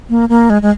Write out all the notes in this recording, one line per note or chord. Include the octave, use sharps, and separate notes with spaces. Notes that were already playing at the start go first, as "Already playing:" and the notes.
A#3
A#3
G#3
G#3